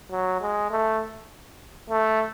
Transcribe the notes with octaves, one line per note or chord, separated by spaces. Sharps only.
F#3
G#3
A3
A3